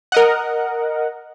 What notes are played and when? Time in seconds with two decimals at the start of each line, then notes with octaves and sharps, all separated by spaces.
0.12 A#4 D#5 F#5